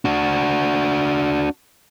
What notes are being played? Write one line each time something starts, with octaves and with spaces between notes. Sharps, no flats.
D4 F#4